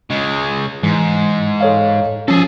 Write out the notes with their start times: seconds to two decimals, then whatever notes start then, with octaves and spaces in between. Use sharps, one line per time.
0.10 C#3 G#3
0.83 G#2 E3
1.61 A4 C#5 F5
2.28 F3 C#4 G#4 A4